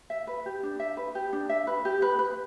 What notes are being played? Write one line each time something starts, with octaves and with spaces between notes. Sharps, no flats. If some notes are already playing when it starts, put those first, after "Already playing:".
E5
B4
G4
D4
E5
B4
G4
D4
E5
B4
G4
B4
B4